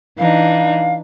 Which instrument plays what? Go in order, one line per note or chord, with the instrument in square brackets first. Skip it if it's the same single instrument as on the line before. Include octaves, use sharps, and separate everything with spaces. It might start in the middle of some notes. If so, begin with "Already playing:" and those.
[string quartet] E3 D4 D#4 [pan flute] F5